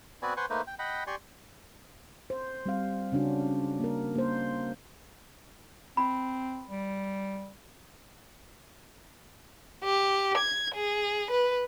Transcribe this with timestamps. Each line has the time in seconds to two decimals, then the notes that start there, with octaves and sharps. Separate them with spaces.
0.22 B3 C4 F#4 B4 D5 G#5
0.37 B4 C5 F#5 G#5 C6 C#6
0.50 A3 A#3 D#4 B4 C5
0.67 G5
0.79 D#5 F#5 G5 B5
1.07 G4 D5 G#5 C6 C#6
2.30 C5
2.66 G3 C4 F5
3.12 C#3 C#4 D4 F#4
3.80 A#3 A#4
4.15 A#3 C5
5.97 C4 B5
6.70 G3
9.84 G4
10.38 G#6
10.75 G#4
11.31 B4